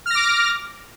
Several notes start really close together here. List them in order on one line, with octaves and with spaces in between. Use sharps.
F6 A#6 D6